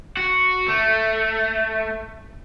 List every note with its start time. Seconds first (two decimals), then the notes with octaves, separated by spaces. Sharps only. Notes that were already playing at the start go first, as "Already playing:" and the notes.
0.17 F#4
0.68 A3